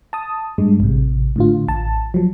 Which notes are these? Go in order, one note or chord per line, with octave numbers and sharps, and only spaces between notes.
A5 D#6
G2 G#3
A1 C3
A2 D3 F4
A1 A5
F3 F#3